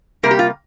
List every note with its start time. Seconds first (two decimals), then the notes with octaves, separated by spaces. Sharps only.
0.23 C3 G3 A#3 A#4
0.31 G4
0.39 F4